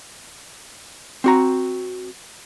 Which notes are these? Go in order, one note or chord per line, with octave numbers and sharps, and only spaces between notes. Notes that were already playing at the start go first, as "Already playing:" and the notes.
C4 F#4 A#5